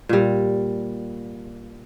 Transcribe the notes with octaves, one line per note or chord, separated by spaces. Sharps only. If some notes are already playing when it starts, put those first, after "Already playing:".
A#2 G3